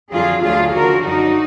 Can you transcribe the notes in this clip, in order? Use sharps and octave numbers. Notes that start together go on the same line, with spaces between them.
F2 D3 F#3 F4 G#4
D2 D3 F#3 F4 G#4
D#2 D3 F3 F#4 A#4
F#2 D3 F#3 D#4 F#4